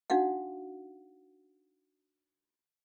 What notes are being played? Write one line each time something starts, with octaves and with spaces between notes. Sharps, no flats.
D4 D#4 F#4 F5 F#5